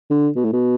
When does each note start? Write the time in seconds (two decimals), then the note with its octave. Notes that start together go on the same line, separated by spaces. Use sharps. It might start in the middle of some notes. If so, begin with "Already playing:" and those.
0.10 D3
0.36 B2
0.44 A2
0.53 B2